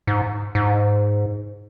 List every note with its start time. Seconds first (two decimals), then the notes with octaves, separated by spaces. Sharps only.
0.07 G#2
0.55 G#2